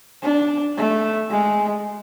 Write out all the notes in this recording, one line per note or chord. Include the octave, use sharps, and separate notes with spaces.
D4
A3
G#3